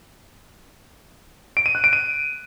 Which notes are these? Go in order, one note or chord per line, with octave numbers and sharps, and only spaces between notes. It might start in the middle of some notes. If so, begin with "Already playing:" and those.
D7
D#7
F#6
D7
D#7